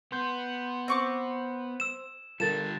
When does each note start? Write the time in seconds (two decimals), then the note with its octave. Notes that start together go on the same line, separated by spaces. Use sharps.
0.12 B3 C6 G6
0.88 C4 C#6 D6
1.80 E6 E7
2.40 D3 G3 F4 A4 A#4 A6 E7